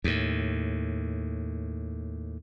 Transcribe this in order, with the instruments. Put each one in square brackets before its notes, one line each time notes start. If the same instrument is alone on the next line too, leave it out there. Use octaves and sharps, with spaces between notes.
[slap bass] D#2 A2